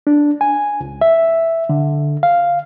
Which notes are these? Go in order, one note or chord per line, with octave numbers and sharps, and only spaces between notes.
D4
G#5
C#2
E5
D3
F5